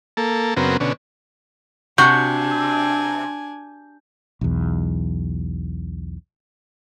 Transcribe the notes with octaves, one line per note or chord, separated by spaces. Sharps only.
A#3 A4
F#2 C#3 B3 C4 A#4
B2 D3 C#4
C3 D4 F#4 G#5 G6
B1 E2